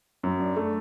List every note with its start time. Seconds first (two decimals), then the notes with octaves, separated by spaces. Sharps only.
0.23 F#2
0.40 D4
0.56 A3